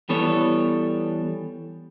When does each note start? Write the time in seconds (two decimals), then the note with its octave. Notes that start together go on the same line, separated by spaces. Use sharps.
0.09 E3 G3 B3 A4 C#5